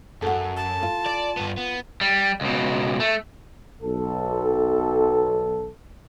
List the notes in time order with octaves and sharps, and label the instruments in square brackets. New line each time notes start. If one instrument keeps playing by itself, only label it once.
[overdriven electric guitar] F#2 [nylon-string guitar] A4 F#5
[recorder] A5
[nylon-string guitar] F4
[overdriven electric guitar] D5
G2 B3
B3
G3
C#2 B2
A3
[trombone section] B1 A4